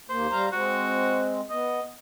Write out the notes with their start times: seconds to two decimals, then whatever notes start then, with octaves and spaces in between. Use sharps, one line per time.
0.10 D#2 A#3 C5
0.32 G3 F5 A#5
0.53 G#3 C4 F#4
1.50 B3 D#5